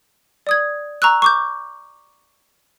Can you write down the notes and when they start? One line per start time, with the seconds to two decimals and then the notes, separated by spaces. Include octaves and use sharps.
0.47 D5 D#6 G#6
1.02 A#5 C#6 E6 F#6
1.22 C#6 D6 G6